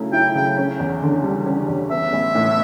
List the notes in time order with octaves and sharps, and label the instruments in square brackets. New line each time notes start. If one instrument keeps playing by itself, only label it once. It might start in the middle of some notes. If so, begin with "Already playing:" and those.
Already playing: [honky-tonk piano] C#3 F#3 A3 E4
[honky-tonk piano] E4 [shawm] G5
[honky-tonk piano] C#3 [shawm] G5
[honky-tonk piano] C#4
E2
D3
G3
C#4
E2
[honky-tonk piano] B3 [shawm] E5
[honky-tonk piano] A1
A2